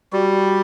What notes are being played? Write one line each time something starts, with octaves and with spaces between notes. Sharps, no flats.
G3 F#4